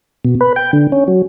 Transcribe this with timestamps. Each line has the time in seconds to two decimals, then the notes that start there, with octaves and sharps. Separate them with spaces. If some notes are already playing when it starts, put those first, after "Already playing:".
0.25 B2
0.41 B4
0.56 G5
0.73 D3
0.92 C#4
1.08 F#3